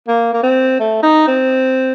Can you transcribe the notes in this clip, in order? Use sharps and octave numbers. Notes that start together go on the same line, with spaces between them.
A#3
A#3
C4
A3
D#4
C4